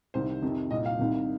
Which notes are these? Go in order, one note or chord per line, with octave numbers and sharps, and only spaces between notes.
C2 C3 D#3 C5
F2 C3 D#3
C2 A#2 D#5
F5
C2 C3 D#3